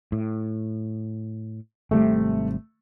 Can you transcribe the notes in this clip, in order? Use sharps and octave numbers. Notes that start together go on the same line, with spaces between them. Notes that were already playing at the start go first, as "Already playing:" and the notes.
A2
G#1 C3 G3 A3